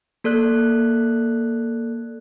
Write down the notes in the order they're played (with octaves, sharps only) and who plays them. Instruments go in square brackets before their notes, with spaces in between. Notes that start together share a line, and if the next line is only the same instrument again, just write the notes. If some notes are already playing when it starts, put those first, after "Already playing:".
[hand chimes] A#3 A4 D5 F#6